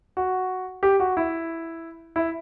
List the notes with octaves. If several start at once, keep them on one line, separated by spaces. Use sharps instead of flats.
F#4
G4
F#4
E4
E4